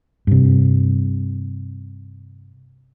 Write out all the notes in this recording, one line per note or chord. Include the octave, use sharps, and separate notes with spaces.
G2 C3